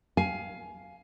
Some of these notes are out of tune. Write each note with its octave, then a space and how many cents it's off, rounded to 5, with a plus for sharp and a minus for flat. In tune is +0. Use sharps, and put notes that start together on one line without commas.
F5 +0 G#5 +20